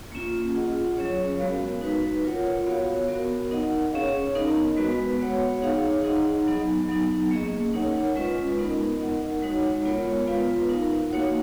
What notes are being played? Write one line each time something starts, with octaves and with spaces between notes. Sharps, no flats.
A#3 C#4 F4
F4 G#4 D#5 F#5
F#3 C#4 G#4 C#5
G#3 B3 F#4 A#4 F5
D#4 F#4 B4
F4 A#4 C#5 F#5
B3 F#4 C#5 F5
B3 F#4 A#4
D#4 A#4 D#5 F#5
C#4 G#4 C#5 F5
B3 D#4 A#4 D#5
G#3 B3 F#4 B4
B3 F#4 C#5 F#5
D#4 G#4 C#5 F5
D#4 G#4 D#5 F#5
F#3 B3 D#4
F#3 B3 D#4
A#3 C#4 G#4 D#5
D#4 A#4 C#5 F#5
G#3 C#4 F4 B4 D#5
B3 D#4 A#4 D#5
D#4 A#4 D#5 F#5
G#3 D#4 F#4 C#5 F#5
G#3 B3 F4 A#4 C#5
B3 F4 B4 F5
D#4 A#4 F5
A#3 D#4 F#4 C#5 F#5